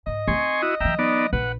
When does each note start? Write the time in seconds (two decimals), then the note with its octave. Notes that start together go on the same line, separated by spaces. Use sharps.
0.07 G#2 D#5
0.28 C4 D#4 G#5 C6 C#6
0.62 E4 F#4 D#6
0.80 E3 F#3 E5 G5 A#5
0.99 B3 D#4 D5
1.33 A#1 B4 F#5